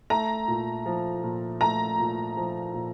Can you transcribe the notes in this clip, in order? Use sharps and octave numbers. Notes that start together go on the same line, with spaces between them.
A3 A#5
A#2
F3
A#2
A3 A#5
A#2
F3
A#2